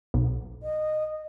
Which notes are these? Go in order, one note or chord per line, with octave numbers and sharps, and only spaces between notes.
B1
D#5